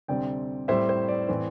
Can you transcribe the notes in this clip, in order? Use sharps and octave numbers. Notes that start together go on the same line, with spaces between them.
D2 C3 G3 C4 D5 G5
A2 G3 C4 C5 E5
C5
D5
A2 E3 C4